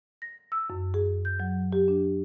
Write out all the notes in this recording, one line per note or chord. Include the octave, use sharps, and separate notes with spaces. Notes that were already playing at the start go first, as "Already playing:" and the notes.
A#6
E6
F#2
G#4
G6
F#3
G4
D4